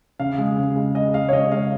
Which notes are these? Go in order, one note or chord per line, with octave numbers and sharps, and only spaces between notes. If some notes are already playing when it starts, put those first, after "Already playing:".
C#3 F5
G#3
C#3
G#3
G#3 D#5
G#3 F5
C#5
C#3 D#5
G#3 F5